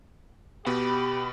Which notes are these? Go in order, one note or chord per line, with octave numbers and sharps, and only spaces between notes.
B2 B3 G4 B5